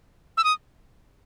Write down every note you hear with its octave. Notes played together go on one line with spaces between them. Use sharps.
E6
D#6